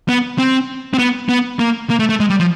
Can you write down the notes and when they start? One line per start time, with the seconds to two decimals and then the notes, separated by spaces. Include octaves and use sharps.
0.08 B3
0.38 C4
0.94 C4
0.99 B3
1.29 B3
1.59 A#3
1.90 A#3
1.99 A3
2.09 A3
2.20 G#3
2.30 G3
2.40 F3